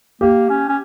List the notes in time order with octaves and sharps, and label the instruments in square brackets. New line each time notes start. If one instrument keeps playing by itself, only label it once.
[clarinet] A#3 [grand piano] G4
[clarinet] C#4
C#4